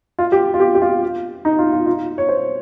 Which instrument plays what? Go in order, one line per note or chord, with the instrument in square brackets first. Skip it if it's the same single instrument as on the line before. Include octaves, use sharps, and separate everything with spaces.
[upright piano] F4
G4
F4
G4
G4
F4
D#4
F4
F4
F4
C#5
C5